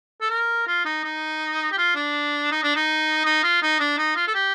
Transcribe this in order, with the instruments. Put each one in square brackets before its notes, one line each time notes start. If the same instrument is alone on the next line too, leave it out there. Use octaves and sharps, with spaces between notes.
[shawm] A4
A#4
F4
D#4
D#4
G4
F4
D4
D#4
D4
D#4
D#4
F4
D#4
D4
D#4
F4
A4
G4